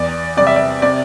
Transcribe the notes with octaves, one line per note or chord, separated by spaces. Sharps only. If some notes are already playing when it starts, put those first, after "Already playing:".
Already playing: E2 D5
C3 G3 D5
E5
D5
C3 D5